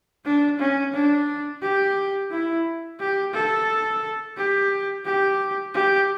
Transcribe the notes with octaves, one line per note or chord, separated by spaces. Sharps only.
D4
C#4
D4
G4
E4
G4
A4
G4
G4
G4